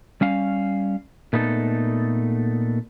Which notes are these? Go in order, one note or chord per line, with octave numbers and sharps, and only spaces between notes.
G3 C#4 F5
A#2 A3 B3 D#4 A4